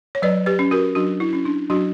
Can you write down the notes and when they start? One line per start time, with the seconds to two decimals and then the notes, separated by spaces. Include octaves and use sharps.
0.15 C#5
0.22 F#3 B4 D5
0.46 G4 B4
0.59 C#4
0.71 F#4 A#4
0.95 F#3 D4 F#4
1.20 E4
1.33 C#4
1.45 D4
1.70 F#3 D4 F#4